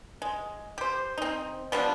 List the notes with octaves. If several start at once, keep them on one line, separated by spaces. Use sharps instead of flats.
G#3
G4 C5
C4 D#4
F3 G3 B3 D4